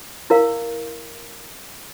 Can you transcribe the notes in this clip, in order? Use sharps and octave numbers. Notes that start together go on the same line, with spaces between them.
E4 A#4 F5